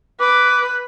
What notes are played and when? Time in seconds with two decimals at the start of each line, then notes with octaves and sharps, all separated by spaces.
0.20 B4 D6